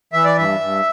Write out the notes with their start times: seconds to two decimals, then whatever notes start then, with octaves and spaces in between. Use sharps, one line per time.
0.13 E3 E5
0.25 D5
0.37 G2 E5
0.60 G2